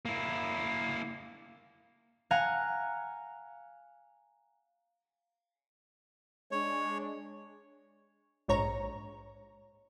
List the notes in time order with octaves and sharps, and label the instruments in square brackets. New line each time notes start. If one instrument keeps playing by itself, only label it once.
[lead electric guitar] A#3 E4
[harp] F5 F#5 G#5 A#5
[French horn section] G#3 D4 [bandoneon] C#5
[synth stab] A#1 G#2 C#5 A#5